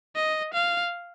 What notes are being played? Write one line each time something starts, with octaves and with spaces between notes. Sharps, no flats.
D#5
F5